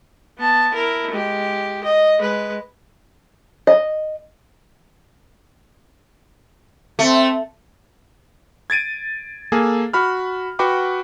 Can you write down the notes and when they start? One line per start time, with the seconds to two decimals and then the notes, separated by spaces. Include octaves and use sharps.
0.38 B3 A5
0.73 E4 A#4
1.10 G#3 G4
1.84 D#5
2.19 G#3 B4
3.67 D#5
6.99 A3 C4
8.70 G#6 A6 D7 D#7
9.52 A#3 G#4 A4
9.93 F#4 B5 F6
10.59 F#4 B4 F#5 G5 B5 D6